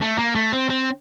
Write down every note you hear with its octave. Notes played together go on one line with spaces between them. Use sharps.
A3
A#3
A3
C4
C4